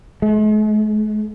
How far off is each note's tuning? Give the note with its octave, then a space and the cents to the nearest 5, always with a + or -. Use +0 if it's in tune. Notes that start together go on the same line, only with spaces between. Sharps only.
G#3 +45